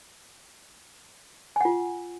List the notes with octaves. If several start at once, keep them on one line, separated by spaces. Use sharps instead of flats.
F4 F#5 G#5